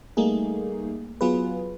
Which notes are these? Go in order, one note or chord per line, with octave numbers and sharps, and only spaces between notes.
G3 A3 A#3 D#4 G#4
F#3 B3 F4 G#4 B4